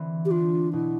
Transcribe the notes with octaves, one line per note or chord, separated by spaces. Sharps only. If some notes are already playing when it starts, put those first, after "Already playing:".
Already playing: D3 E3 C4
G4
D4 F4
B2 E4